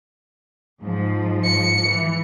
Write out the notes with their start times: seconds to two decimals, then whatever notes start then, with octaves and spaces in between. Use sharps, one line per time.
0.81 G#2 F3
1.44 C#7
1.86 E3